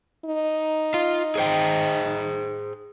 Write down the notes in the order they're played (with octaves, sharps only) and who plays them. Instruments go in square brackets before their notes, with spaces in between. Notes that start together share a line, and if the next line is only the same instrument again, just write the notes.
[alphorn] D#4
[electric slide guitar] F4 F5
G#4 C5 G5